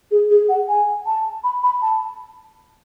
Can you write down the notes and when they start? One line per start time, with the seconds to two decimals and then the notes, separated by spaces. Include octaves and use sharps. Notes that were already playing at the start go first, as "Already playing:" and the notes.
0.11 G#4
0.30 G#4
0.49 F#5
0.69 G#5
1.06 A5
1.44 B5
1.63 B5
1.82 A5